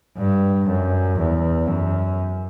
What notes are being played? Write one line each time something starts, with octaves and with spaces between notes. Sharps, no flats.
G2
F#2
E2
F#2